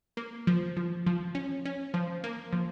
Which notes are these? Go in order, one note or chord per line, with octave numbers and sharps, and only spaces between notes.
A#3
F3
F3
F3
C#4
C#4
F3
A#3
F3